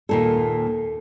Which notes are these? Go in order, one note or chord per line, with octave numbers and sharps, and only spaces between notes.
D#2 A#2 A4